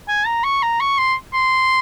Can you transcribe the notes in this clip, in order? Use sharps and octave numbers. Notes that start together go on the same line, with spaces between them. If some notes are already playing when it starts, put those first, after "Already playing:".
G#5
A#5
C#6
A#5
C#6
C6
C6